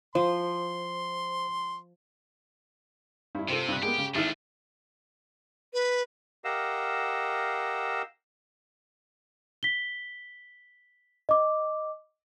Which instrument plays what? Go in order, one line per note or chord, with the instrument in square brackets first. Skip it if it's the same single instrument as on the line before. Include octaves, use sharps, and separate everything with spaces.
[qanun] F3 [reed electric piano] C5 [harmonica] C6
[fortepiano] G2 E4
[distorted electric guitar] C3 [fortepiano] C4 F4 A4
[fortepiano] G2 F#6
[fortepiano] G#3 A#3 B3 [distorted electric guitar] G4
[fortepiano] C#3
[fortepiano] G#1 E4 F6 [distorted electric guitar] A3 D4
[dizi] B4
[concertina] G4 A#4 D#5 F5 F#5 E6
[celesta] B6 G7
D#5 D6